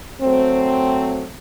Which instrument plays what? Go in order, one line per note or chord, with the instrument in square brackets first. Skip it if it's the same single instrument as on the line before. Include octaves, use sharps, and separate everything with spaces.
[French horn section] F#3 A3 C4